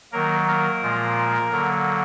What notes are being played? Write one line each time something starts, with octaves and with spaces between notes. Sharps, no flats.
D#3 F#3 A#3 A#4
A#3 A#4
A#2 F3 G#3
D3 F#3 A#3